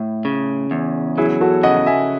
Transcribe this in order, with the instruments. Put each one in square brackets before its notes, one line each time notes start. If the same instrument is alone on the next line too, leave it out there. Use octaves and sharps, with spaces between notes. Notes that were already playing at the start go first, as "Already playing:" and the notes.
Already playing: [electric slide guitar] A2
C#3
E2
[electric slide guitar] F#3 [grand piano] E4 G#4
[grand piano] F#4 A4
[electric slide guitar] C#3 [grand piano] D#5 F#5
[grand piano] F#5
E5 G#5